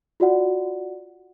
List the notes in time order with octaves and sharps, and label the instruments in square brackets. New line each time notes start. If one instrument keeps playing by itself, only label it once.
[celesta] F4 F#4 D5 F#5